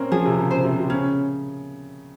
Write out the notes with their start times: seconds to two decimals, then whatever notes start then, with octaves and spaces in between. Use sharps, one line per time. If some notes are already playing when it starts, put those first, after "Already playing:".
Already playing: A#3 C4 C#4
0.12 F3 G#4
0.25 C3
0.38 C#3
0.51 C5
0.64 C3
0.79 C3
0.90 C#3 C#4